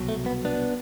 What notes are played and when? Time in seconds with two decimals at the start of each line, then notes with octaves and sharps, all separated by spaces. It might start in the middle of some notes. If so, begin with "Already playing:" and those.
Already playing: C2 B2 F#3
0.09 A3
0.26 B3
0.45 B3 D4